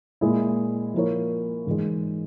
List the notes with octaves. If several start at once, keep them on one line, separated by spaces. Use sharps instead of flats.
A#2 G#3 E4 G#4
F3 A#3 E4 A#4 C#5
G#2 E3 G#3